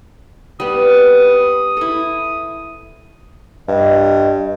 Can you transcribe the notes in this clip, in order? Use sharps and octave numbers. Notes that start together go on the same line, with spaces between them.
G3 B3 D#6
E4 A4
G2 D#5